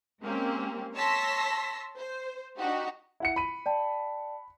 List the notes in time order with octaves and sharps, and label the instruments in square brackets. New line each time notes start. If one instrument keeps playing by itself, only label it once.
[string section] G#3 A#3 C4 C#4 G4
C#5 A5 C6 E6 A#6 B6
C5
D4 D#4 F#4 G4
[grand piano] E4 F#5 C#7
B5 D#7
[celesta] D5 G5 A5